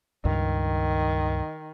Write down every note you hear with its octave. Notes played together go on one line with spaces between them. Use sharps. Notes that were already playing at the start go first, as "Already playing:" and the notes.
C#2 G2 D#3